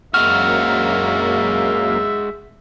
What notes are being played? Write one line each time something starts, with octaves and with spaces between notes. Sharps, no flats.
F#2 G#3 A#3 F#4 E5 F6